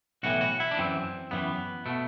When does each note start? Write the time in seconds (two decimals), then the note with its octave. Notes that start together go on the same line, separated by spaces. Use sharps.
0.23 B1 A2 E3 F#4
0.41 F#4
0.60 E4
0.71 D4
0.78 F#2 E3 C4
1.31 F#2 E3 B3
1.86 B2 A3